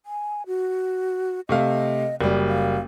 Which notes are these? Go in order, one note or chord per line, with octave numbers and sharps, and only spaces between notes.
G#5
F#4
C3 A3 D#5 F5
F#1 G3 D5
F5